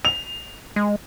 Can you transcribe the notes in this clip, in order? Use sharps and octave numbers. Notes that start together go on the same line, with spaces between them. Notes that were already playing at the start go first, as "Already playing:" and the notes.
F7
G#3